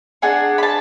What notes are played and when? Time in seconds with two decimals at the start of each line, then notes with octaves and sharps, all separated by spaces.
0.22 D4 G#4 F#5
0.58 B5
0.63 A5